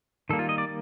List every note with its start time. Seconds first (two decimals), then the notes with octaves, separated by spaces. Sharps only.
0.30 D#3 G3 A#3 A4
0.39 F4
0.49 D#5
0.58 D5